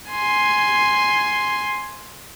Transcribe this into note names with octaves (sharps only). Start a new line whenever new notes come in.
G#5 C6